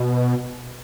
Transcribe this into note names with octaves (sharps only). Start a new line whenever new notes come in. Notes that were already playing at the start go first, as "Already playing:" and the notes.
Already playing: B2